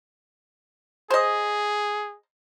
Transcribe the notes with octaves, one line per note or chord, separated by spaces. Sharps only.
G#4 C5 D#5